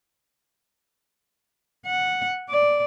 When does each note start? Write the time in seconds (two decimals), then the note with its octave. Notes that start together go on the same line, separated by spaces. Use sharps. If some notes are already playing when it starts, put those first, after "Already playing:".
1.86 F#5
2.50 D5